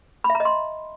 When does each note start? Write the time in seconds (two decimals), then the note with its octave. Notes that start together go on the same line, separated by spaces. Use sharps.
0.24 B5
0.30 E5
0.35 A#5
0.40 D#5
0.45 C6